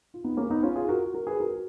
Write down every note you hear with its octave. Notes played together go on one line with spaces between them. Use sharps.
F4
B3 D#4
A#3 C#4
B3 D#4
C#4 F4
F4 G#4
F#4 A#4
F#4 A#4
G#4 B4
F#4 A#4